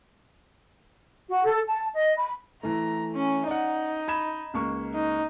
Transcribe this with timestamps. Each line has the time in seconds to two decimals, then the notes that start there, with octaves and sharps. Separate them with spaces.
1.29 F#4
1.43 A4
1.66 A5
1.92 D#5
2.16 B5
2.63 E3 A3 A#5
3.14 C#4
3.47 D#4 D5 F#5
4.08 B5 G#6 E7
4.54 C#2 A#3 C#6
4.94 D#4